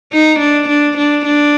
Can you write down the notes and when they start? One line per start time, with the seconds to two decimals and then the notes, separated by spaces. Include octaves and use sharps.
0.12 D#4
0.40 D4
0.68 D4
0.97 D4
1.26 D4